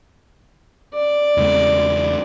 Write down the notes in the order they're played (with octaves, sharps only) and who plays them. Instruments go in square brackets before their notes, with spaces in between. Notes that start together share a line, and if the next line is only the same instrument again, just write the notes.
[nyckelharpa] D5
[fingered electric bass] E2 C#3 G#3